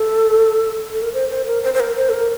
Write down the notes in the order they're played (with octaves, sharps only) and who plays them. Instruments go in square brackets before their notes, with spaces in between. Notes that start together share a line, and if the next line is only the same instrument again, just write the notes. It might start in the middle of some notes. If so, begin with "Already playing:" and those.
Already playing: [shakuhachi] A4
A4
A#4
C5
C5
A#4
C5
C5
A#4
C5
A4
A#4